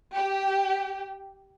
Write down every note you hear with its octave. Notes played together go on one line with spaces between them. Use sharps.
G4